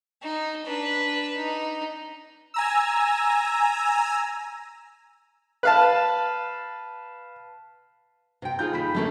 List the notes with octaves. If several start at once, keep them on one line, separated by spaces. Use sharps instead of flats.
D#4
D4 B4
D#4
G#5 A#5 E6
B4 F5 A5
C3 G5
D#4 F4 G#4 G6
D#1 B5 B6
F#2 D3 A3 A#3 C#4